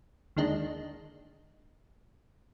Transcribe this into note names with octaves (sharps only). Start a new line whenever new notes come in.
D#2 D3 G#3 D4 D#4